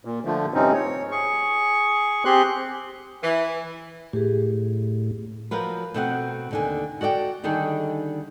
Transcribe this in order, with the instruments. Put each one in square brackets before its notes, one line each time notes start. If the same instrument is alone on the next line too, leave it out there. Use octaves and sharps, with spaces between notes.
[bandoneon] A#2
D3 F3 A3
G2 C3 F3 C4 C#4 D#4
C#5
G#4 C#6
C4 G4 G#4 C6 F#6
[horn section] E3
[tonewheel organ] A2 [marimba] G4 G#4
[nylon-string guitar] F3 F#3 F4 A#4 B4
B2 A3 C4 B4 C5 F#5
D#2 D3 G#5
F#4 A4 D5 D#5 G5
D3 D#3 G3 G#4 A4